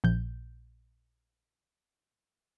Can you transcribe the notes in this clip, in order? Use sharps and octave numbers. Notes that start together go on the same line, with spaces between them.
A#1 G6